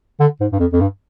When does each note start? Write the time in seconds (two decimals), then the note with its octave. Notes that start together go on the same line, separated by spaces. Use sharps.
0.20 D3
0.40 G#2
0.52 G2
0.60 F2
0.73 F2
0.81 G2